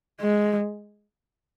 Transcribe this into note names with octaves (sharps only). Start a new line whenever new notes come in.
G#3